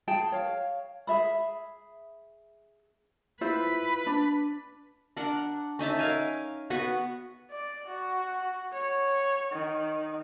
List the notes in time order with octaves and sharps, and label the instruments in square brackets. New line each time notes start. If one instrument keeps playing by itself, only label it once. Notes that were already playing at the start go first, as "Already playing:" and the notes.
[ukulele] G#4 G5 A5
C#5 F5
G#4 E5 B5
[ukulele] E4 F4 C5 [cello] B4
[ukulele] D4
[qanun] D4 A#4 F#5
C#4 D#4 E5 A5
A#4 F5 G#5
B3 F#4 B4 C#6
[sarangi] D5
F#4
C#5
D#3